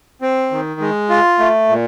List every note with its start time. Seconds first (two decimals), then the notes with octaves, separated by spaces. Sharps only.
0.22 C4
0.51 D#3
0.81 G#3
1.10 F4
1.39 A3
1.68 A#2